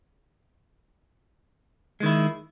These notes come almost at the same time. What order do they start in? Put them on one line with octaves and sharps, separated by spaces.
G#3 D#3 E4